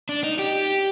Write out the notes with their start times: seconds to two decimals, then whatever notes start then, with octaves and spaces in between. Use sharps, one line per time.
0.09 D4
0.24 D#4
0.39 G4